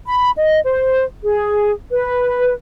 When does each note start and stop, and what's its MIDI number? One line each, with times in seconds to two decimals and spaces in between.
0.06 0.30 83
0.36 0.60 75
0.65 1.05 72
1.23 1.72 68
1.91 2.53 71